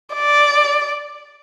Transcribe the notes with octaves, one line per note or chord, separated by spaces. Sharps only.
D5